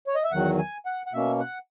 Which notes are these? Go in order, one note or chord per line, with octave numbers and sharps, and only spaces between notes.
C#5
D#5
E5
E2 D#3 F#3 F#5
G#5
F#5
F#5
B2 A#3 C#4 E5
F#5